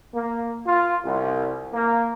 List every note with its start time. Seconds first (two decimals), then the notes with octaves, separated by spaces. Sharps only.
0.13 A#3
0.66 F4
1.04 C2
1.74 A#3